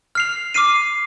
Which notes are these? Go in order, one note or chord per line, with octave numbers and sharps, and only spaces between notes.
F6 C7 F7
D6 F6 C7 D#7